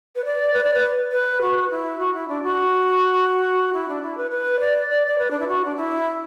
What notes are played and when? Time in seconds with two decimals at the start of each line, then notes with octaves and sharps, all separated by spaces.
0.16 B4
0.25 D5
0.53 B4
0.64 D5
0.74 B4
1.12 B4
1.41 F#4
1.70 E4
1.99 F#4
2.13 E4
2.28 D4
2.43 F#4
3.73 E4
3.88 D4
4.02 E4
4.17 B4
4.31 B4
4.60 D5
4.89 D5
5.07 D5
5.18 B4
5.31 D4
5.40 E4
5.48 F#4
5.65 D4
5.76 E4